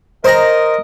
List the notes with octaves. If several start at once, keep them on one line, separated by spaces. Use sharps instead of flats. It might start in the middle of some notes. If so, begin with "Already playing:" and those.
A#4 C5 D#5 A#5